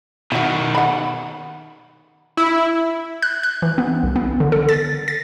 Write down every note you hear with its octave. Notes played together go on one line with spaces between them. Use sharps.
B2 D#3 E4 F#4
F#5 B5
E4
F#6
F#6
E3
B3
C2
B3
D3
A4
A6
A6